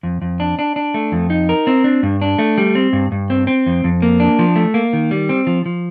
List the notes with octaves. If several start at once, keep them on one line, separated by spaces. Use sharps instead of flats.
F2
F2
D4
D4
D4
A3
F2
D#4
A#4
C4
D4
G2
D4
A3
G3
C4
G2
G2
C4
C4
F2
F2
A#3
D4
F3
A3
A#3
D#3
G3
C4
F3
F3